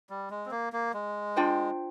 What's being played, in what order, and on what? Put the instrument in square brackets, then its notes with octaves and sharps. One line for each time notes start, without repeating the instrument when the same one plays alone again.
[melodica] G3
G#3
C4
A#3
A#3
G#3
[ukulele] D4 F4 C5 G5